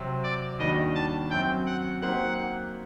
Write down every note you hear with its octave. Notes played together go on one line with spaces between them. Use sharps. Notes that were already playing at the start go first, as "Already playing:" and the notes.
Already playing: C3 F#3 C4
D5
D#2 D#3 G3 D4 F#4 D#5
A5
F#2 F#3 C4 G5
F#5
F#3 A#3 D#4 G4 C5 F#5